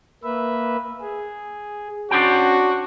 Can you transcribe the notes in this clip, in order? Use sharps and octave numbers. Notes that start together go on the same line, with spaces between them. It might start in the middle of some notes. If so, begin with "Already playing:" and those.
A#3 B4 E5
G#4
C#4 D4 F#4 C5 G5